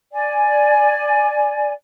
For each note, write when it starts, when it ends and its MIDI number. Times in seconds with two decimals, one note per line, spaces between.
0.13 1.71 74
0.13 1.71 80